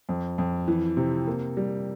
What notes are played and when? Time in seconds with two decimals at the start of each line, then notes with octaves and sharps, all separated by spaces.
0.09 F2
0.38 F2
0.68 E3
0.97 C3
1.27 A#3
1.57 G3